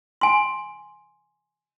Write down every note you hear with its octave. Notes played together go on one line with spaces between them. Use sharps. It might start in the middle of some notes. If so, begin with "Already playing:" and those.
G#5 C6